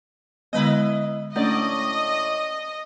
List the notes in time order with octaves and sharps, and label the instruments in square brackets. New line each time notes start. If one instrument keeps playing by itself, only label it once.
[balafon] D3 G#3 B3 [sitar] E4 B4 D#5
[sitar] A2 D5 [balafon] A3 C#4 D4 [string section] D#5